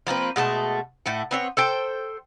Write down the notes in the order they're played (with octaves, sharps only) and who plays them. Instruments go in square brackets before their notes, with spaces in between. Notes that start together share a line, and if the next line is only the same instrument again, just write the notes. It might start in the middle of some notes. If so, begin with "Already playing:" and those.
[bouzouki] F3 A#3 C4 B4
B2 G#3 A3 A5
A2 A3 F#5
B3 C4 C#5
A4 C5 G5